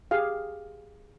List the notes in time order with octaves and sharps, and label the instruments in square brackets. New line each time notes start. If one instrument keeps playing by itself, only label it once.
[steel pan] G4 G#4 F5